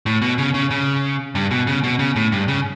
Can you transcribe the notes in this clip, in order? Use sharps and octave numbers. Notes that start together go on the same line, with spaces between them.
A2
B2
C#3
C#3
C#3
G2
B2
C#3
B2
C#3
A2
G2
C#3